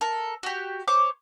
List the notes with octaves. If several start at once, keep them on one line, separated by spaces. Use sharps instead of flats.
A4 A#4
F#4 G4
C5 C#5 D6